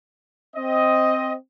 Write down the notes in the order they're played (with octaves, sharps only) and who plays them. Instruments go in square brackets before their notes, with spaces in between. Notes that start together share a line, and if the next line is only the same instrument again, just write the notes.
[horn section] C4 D#5